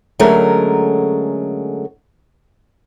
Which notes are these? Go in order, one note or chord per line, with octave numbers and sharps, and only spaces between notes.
D3 F#3 G#3 A3 C#4 A#4